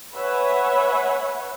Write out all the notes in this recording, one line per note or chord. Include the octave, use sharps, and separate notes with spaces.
B4 C#5 E5 F#5 G#5 B5